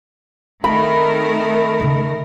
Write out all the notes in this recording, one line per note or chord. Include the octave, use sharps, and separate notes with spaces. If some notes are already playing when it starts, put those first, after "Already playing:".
D#3 A3 C4 A#4 B5
C#3 D#4